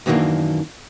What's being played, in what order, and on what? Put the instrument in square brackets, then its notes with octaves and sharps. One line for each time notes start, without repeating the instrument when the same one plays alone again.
[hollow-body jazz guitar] F#2 D#3 E3 G3 A#3 D4